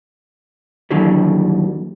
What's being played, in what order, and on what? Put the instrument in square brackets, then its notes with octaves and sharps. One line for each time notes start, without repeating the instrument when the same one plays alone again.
[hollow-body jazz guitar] D#2 D3 E3 F#3 G3